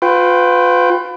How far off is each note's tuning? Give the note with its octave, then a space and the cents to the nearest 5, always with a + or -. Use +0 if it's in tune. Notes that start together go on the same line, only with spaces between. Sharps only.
F4 +30 B4 +30 G5 +0